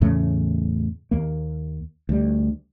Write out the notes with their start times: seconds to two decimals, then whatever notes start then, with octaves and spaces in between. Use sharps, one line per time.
0.01 E2 A2 C#3 A3
1.11 D#2 A#3
2.09 D2 G3